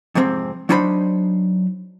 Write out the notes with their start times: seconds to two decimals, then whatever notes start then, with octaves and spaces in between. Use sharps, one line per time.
0.15 F2 G#2 C3 C4
0.69 F#3 D4 D#4 C5 G#5 B5